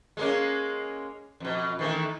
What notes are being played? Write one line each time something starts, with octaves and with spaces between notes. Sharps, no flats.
G#3 A#3 C#4
F2 B2
D#3 E3 A3